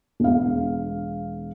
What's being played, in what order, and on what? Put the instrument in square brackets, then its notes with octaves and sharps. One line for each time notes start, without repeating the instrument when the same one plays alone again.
[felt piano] E1 F5